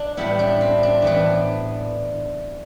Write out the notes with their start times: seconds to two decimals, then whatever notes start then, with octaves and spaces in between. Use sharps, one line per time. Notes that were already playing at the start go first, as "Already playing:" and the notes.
Already playing: D4
0.17 A2 G3 B3 E4
0.39 D4
0.61 C4
0.83 D4
1.02 A2 E3 B3 D4